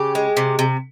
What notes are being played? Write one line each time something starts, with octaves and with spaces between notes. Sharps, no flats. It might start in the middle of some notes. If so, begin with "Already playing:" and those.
Already playing: C#3 G4
G#3
C3
C3